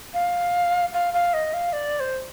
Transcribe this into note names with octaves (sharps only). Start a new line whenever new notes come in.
F5
F5
F5
D#5
F5
D5
C5